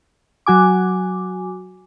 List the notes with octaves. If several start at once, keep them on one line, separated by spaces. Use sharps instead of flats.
F#3 F#4 G#5 D6